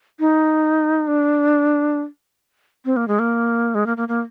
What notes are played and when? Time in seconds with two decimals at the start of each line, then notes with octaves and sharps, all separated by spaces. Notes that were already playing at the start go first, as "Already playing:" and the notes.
0.20 D#4
1.07 D4
2.85 C4
2.96 A#3
3.08 G#3
3.19 A#3
3.75 G#3
3.86 A#3
3.97 A#3
4.08 A#3